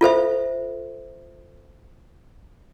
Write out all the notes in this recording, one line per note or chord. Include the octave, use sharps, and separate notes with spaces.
F4 A4 C5 E5